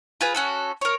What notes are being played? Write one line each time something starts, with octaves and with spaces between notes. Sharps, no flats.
F4 G#4 B4
C#4 F#4 A4
A#4 C#5